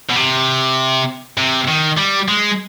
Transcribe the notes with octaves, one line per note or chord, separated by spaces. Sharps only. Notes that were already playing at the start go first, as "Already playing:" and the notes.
B2
C3
C3
D#3
G3
G#3